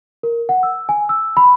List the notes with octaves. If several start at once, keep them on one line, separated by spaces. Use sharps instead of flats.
A#4
F#5
E6
G#5
E6
B5